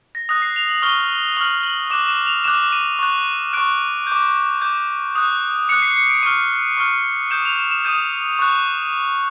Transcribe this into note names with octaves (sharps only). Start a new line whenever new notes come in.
A#6
D#6 F#6 A#6
C7
F7
F#7
C#6 F6 G7
C#6 F6 F#7
F#7
D6 F#6 E7
E7
F7
D6 F#6 E7
D#7
C#6 F#6
C#6 F#6 D7
D6 G6
D6 G6
D#6 F#6
D#6 F#6 C#7
C7
C#7
D7
C#6 F6 D#7
C#6 F6
D#6 G6 E7
F7
E7
E7
D#6 G6 D#7
C#6 F#6